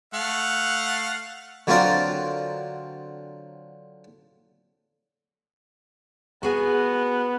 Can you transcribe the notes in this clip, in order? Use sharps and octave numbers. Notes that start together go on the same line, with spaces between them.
A3 F5 F#5
D3 F#3 C4 F4 A#4 D5
B3 F#4 G#4 G#5